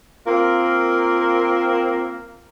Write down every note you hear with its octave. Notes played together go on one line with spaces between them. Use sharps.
A#3 C4 F4 A#4